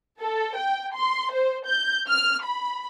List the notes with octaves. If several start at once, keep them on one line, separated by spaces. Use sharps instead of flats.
A4
G5
C6
C5
G6
F6
B5